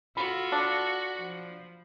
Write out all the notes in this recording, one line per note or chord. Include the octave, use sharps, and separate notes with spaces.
F4 F#4 A4 B5
D4
F3